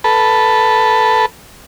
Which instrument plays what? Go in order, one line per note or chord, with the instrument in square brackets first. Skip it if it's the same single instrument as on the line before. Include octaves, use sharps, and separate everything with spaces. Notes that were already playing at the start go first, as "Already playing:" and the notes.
[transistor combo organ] A4 B4